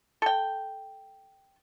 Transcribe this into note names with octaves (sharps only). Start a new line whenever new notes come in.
A4 G5